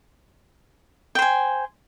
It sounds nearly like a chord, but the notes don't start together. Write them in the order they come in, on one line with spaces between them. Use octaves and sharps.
G5 C5 G#5